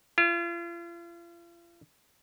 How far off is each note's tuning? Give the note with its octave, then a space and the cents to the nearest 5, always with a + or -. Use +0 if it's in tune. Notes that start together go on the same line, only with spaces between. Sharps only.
F4 -40